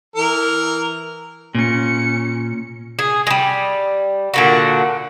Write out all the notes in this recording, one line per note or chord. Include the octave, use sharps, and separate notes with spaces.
E3 A#4
A#2 C#4 C#7
G#4
G3 G#3
A#2 D3 F#4